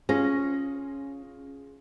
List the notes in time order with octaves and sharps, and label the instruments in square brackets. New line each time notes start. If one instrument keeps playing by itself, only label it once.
[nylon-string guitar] C#4 [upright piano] F4 G#4 A#6